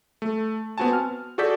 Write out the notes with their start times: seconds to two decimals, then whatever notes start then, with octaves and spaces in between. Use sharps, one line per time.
0.22 A3
0.78 B3 C4 F#4 G#5 A5
0.93 F6
1.38 F#4 G#4 A4 D5 G6 B6